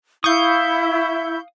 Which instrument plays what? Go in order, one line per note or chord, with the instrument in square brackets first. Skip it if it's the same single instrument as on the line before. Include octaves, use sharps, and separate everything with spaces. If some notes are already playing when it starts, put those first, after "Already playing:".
[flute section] E4 [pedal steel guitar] F5 D#6 [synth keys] C#6 G6